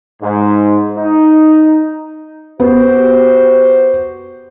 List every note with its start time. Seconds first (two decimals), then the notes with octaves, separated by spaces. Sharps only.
0.21 G#2
0.97 D#4
2.60 B3 F#4 G4 C5